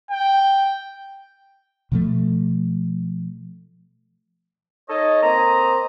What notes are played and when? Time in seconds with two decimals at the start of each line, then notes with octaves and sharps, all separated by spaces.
0.11 G5
1.92 B2 F3 A3
4.89 D#4 A4 C#5 D#5
5.22 A#3 C4 C5 D#5 A#5